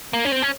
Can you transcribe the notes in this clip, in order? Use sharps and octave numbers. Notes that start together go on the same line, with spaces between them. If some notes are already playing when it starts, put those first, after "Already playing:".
A#3
C#4
C4
C#4